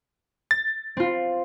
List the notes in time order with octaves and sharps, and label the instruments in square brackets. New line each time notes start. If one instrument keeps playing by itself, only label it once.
[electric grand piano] A6
[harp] C4 F4